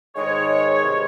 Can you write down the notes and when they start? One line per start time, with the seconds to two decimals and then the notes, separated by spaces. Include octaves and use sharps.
0.16 G#2 D#3 G#3 C#5
0.84 C3 E3 G#3